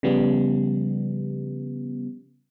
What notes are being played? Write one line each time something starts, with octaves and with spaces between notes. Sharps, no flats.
C#3 F3 G3 B3